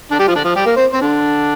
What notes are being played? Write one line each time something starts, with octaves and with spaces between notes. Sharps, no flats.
D3 D4
G3 G4
F3 F4
D3 D4
F3 F4
G3 G4
A#3 A#4
C4 C5
C4 C5
D3 D4